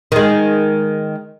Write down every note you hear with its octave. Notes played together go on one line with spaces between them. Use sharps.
D#3 G#3